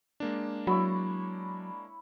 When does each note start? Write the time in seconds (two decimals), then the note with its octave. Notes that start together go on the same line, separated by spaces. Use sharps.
0.20 G#3 A#3 D4
0.67 F#3 E4 C#5 B5